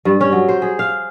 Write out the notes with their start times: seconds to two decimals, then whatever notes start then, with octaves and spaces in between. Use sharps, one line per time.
0.05 G2
0.20 C#4
0.32 F#3
0.48 C5
0.62 G#4
0.79 F5